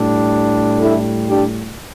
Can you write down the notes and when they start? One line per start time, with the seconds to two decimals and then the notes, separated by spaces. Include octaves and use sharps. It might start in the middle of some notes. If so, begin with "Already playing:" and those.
Already playing: A2 G3 D4
0.79 E4 A4
1.28 D4 G4